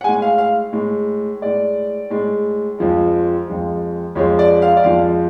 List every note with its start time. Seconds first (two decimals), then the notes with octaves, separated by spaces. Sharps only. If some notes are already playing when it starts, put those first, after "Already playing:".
0.01 F#5
0.04 G#3 G#5
0.08 A2
0.22 F5
0.38 F5
0.73 A2 G#3
1.42 A2 G#3 D5
2.10 A2 G#3
2.79 F2 F3 G#3
3.47 F2 F3 G#3
4.15 F2 F3 G#3 C#5
4.39 D5
4.62 F5
4.77 D5
4.84 F2 F3 G#3 F5